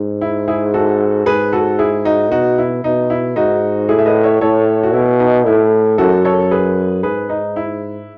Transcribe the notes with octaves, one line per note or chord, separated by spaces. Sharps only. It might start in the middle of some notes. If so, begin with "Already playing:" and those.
Already playing: G#2
E4
E4 G#4
F#4 A4
G#2 G#4 B4
F#4 A4
E4 G#4
D#4 F#4
B2 D#4 F#4
E4
B2 D#4
E4
G#2 D#4 F#4
A2 E4 G#4
E5
B4 D#5
C#5 E5
A2 A4 C#5
F#4
B2 E4
D#4
A2 E4
F#2 F#4 A4
A4 C#5
G#4 B4
G#2 G#4 B4
D#4
E4